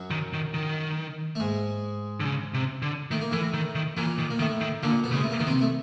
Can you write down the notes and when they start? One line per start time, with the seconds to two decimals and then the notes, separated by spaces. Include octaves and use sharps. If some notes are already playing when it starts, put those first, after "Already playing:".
Already playing: F#2 F#3
0.11 D#3
0.33 D#3
0.54 D#3
1.35 A3
1.40 G#2 G#3
2.20 D3
2.25 C#3
2.54 C3
2.82 D3
3.11 D#3 A3
3.21 A#3
3.31 A2 E3 A3
3.54 D#3
3.75 D#3
3.97 A#2 E3 A#3
4.18 D#3
4.30 A#3
4.39 A2 D#3 A3
4.61 D#3
4.83 A#2 D3 A#3
5.04 B2 B3
5.11 C#3 G#3
5.23 A3
5.31 A#3
5.39 D#3 B3
5.47 C3 C4
5.61 A3